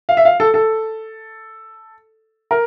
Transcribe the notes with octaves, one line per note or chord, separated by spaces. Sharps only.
F5
E5
F5
A4
A4
A#4